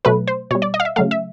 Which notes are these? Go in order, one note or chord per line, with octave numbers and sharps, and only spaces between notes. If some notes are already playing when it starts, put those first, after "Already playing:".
B2 F#3 A3 B4
C5
B2 G3 C#5
D5
D#5
F5
E5
C#3 F#3 A3 F5
E5